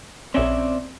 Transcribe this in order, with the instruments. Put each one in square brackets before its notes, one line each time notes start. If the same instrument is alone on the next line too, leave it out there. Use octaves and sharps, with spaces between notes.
[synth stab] A#1 C#4 [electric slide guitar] C4 D5 E5